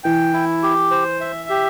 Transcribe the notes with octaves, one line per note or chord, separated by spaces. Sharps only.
E3 G5
E4
G4
C5
E5
G4